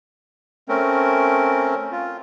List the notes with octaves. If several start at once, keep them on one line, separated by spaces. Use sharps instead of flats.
A3 C4 C#4 A#4
F4